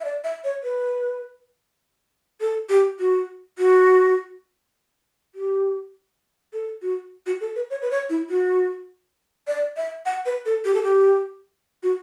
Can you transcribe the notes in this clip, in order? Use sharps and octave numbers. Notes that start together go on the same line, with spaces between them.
E5
D5
E5
C#5
B4
A4
G4
F#4
F#4
G4
A4
F#4
F#4
A4
B4
C#5
B4
C#5
E4
F#4
D5
E5
F#5
B4
A4
G4
A4
G4
F#4